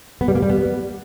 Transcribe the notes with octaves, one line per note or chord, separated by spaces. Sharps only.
B3
G3
A#3
G3
B3